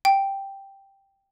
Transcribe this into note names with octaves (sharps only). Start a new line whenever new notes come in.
G5